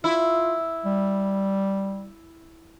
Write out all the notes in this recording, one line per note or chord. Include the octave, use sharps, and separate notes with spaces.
E4 F4
G3